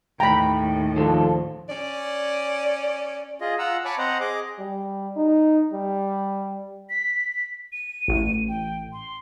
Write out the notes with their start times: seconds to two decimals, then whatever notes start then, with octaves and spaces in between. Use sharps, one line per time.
0.20 D#2 A2 G5 A#5 B5
0.96 D#3 F3 A4
1.69 C#4 D5
3.41 F4 G#4 D#5
3.58 F4 F#5 A#5 E6
3.85 C#5 G#5 A5 B5 C#6 D6
3.98 C4 C5 D#5 F#5 A#5
4.21 G#4 D#5 D6
4.59 G3
5.16 D#4
5.73 G3
6.90 B6
7.73 D#7
8.08 A1
8.48 G5
8.92 C6